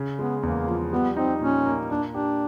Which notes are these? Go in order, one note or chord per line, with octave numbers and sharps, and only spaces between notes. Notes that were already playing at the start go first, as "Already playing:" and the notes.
Already playing: C#3
G#3 B3
E2 A#3
F3
G3 B3
C4 D#4
A#2 C#4
A#3
A#3 D4
D4 G4